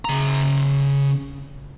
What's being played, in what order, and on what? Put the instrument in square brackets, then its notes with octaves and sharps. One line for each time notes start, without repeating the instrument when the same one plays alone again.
[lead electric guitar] C#3 A#5